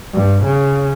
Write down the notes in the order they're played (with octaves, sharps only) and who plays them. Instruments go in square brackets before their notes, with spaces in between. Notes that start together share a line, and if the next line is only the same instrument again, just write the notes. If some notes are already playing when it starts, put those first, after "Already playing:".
[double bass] G2
C#3